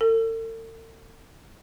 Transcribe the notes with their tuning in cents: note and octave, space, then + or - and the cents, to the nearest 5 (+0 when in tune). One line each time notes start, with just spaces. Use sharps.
A4 +45